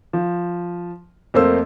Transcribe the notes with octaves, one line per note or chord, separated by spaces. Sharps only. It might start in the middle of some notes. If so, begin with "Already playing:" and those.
F3
F2 A3 A#3 C5 E6